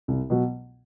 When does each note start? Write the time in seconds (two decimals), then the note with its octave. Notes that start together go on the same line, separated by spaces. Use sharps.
0.08 C2
0.30 B2 F#3